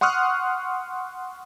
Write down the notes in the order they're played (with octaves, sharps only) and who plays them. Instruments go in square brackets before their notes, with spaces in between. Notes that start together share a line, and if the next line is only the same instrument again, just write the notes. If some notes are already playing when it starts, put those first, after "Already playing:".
[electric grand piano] F#5 C6 C#6 D#6 F6 F#6